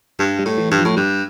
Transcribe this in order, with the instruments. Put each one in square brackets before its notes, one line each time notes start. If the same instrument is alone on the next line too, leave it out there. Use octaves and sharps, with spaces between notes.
[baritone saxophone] G2 [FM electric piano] G3
[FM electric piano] G3
[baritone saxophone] A2
[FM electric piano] E3
[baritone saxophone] G2
[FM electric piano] F3
[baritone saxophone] A2
[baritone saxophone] G2 [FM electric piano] G3